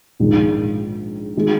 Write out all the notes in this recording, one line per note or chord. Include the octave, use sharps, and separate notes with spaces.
A#1 G#2 D#3 G#3
D#3 G#3